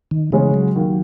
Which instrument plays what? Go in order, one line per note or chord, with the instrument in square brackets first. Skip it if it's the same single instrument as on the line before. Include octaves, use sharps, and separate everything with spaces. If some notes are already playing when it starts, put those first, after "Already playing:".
[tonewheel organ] D#3
[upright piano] C#3 G#3 C#4 [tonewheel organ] E3
[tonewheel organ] F#3
[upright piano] D#2